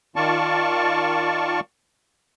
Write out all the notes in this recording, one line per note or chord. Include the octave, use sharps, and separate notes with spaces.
D#3 F4 D5 A5 C#6